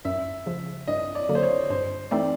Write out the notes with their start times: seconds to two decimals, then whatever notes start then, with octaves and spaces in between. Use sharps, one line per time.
0.05 F#2 E5
0.46 C#3 F3
0.87 G2 D#5
1.15 D5
1.29 D3 F#3 A#3
1.35 C5
1.43 C#5
1.70 G2 C5
2.11 E3 A3 C4 D#4 D5